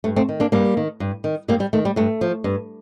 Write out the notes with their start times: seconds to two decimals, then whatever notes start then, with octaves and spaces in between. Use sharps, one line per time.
0.04 G2 A3
0.16 A3 C4
0.29 D#3
0.40 A#3 D4
0.52 G2 G3 A#3
0.77 D#3
1.00 G2
1.24 D#3
1.48 G2 G3 A#3
1.60 G3
1.73 D#3 A3
1.85 G3
1.96 G2 A3
2.21 F3
2.44 G2